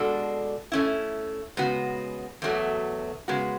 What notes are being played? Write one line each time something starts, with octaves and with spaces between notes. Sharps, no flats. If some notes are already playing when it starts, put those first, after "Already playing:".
Already playing: B2 G#3 D4 F#4 A4
A3 C#4 E4
C#3 G#3 B3 F#4
E2 B2 F#3 A3
C#3 G#3 B3 F#4